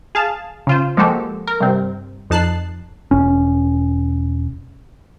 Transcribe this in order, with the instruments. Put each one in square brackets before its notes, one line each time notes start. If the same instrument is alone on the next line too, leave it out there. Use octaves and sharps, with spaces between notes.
[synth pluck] G#4 F5 A5
C#3 F4 C5
F3 G#3 A#3 F#4 G4 A4
A#4
G2 C3 C4
F2 D#4 A5 F#6 C7
[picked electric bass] E1 C#4